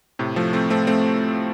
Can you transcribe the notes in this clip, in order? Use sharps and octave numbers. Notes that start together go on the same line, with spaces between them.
A2 C3
F3 A3
A3 C4
A3 C4
A3 C4